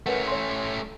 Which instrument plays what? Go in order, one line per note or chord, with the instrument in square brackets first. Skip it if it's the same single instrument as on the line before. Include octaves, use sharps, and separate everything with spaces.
[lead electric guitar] A3 C#4 [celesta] A#4 B4 F#5
[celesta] C#5 C6